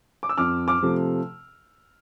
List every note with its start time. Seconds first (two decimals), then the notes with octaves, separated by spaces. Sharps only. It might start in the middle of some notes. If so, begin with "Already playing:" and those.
0.23 D6
0.29 E6
0.38 F2 D6 F6
0.68 D6 F6
0.82 C3 F3 A3